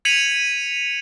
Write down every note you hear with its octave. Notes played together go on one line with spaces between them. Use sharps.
G#6 B6 C#7 D#7 F7 F#7